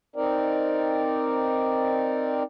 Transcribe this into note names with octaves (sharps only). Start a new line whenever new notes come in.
C4 D#4 A#4 D5